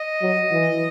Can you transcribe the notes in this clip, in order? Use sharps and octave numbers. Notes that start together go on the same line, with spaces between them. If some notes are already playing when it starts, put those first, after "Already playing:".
Already playing: D#5
F#3
E3